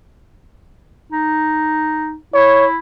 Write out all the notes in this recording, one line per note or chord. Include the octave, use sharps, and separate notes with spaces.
D#4
E4 C#5